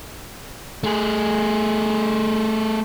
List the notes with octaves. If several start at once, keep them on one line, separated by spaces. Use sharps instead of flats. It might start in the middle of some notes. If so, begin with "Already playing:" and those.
A3 G#4